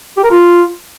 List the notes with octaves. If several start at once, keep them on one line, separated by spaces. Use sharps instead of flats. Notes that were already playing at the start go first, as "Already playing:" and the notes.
G4
A#4
F4